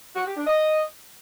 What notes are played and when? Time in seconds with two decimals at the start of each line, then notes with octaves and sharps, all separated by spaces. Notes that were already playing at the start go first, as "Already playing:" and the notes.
0.15 F#4
0.26 G4
0.36 D4
0.47 D#5